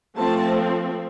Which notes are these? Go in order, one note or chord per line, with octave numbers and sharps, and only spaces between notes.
F3 A3 C4 A5